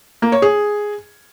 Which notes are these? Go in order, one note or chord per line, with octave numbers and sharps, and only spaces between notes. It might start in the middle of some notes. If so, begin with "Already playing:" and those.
A#3
C#5
G#4